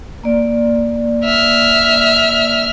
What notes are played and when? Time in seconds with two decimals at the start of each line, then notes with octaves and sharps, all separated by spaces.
0.24 A#3 D5
1.24 E5 F6